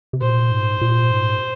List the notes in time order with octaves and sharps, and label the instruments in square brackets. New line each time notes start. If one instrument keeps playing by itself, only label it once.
[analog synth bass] C3
[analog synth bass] A#2 [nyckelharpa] C5
[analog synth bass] G#2
A#2
G#2